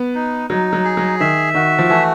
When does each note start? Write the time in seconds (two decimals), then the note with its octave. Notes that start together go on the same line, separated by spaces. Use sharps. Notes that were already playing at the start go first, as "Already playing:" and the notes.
Already playing: B3
0.15 D#4
0.50 F#3 D#4
0.73 F#3
0.84 G#4
0.97 F#3
1.20 D#3 E5
1.54 D#3 F#4
1.79 F3
1.89 E3 A3